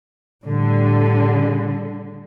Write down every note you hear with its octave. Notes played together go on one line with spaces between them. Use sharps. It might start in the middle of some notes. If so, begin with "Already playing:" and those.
A2 D3 G3